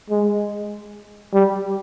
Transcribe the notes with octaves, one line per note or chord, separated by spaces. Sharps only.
G#3
G3